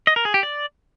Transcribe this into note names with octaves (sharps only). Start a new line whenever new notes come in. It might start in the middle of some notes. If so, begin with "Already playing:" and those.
D#5
A#4
G#4
G4
D5